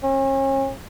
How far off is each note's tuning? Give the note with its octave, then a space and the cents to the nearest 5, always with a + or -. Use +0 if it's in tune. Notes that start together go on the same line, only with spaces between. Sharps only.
C#4 -40